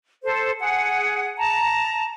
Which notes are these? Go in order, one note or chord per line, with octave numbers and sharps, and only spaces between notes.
A4 C5
G#4 F#5
A5 A#5